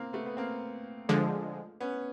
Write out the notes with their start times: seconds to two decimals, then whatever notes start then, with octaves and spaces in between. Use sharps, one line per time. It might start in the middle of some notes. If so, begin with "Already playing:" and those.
Already playing: A#3 C4
0.13 A3 B3
0.26 B3
0.37 A#3 C4
1.09 D3 F3 G#3
1.81 B3 C#4